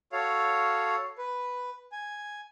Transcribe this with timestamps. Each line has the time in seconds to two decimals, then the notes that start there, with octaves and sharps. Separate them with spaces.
0.12 F#4 A4 C#5 F5
1.18 B4
1.92 G#5